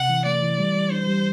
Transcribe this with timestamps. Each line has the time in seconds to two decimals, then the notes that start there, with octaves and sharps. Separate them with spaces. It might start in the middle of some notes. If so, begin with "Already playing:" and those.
Already playing: C3 F#5
0.10 E3
0.25 A3 D5
0.42 E3
0.58 G3
0.75 G3
0.91 D4 C5
1.07 G3